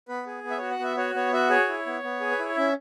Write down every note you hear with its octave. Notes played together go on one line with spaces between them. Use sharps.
B3 B4
G#4
B3
E5
F#4 C#5
F#5
B3 E5
F#4 C#5
B3 C#5
F#4 E5
G#4 C#5
E4
B3
B3
G#4
B4
E4 C#5
C#4 E5